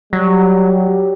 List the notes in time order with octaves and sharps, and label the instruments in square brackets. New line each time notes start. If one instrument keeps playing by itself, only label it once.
[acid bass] F#3 [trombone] G3
[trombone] G4